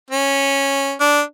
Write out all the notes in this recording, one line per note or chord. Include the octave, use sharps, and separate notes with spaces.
C#4
D4